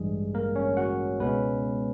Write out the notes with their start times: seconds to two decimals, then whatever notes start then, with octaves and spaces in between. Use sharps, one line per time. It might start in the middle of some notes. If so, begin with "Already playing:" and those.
Already playing: A1 G2 E3 G3 G#3 G#4
0.34 A#3 A#4
0.56 C#4 C#5
0.77 F#4 F#5
1.20 C#2 B2 G#3 B3 C#4 B4